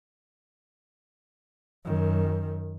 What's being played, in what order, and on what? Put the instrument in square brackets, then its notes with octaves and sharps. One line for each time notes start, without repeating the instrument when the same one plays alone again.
[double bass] F#2 D#3